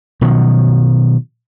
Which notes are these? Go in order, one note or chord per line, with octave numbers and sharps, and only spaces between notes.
B2 D#3 F3 F#3